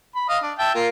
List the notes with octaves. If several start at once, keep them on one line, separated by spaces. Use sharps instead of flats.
B5
D#5 F5
D4
E5 G5 A5
A#3 F4